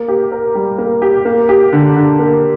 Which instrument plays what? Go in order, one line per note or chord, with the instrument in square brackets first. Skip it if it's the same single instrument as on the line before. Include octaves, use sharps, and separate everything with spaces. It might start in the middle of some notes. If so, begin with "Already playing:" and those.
Already playing: [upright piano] A#3
G4
A#4
G3
A#3
G4
A#3
G4
D3
D3
A#3